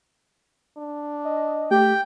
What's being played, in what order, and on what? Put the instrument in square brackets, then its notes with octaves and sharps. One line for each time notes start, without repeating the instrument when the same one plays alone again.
[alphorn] D4
[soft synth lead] D#5
[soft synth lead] A3 [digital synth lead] G4 [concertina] G5